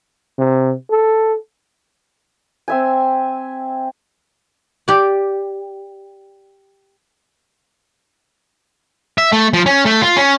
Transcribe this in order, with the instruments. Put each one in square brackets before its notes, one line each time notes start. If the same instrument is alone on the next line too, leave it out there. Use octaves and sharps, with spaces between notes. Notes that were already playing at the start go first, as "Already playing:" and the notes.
[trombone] C3
A4
[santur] C4 E5 G#5
[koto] G4 D5
[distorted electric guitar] E5
A3
F3
C#4
A3
F4
C#4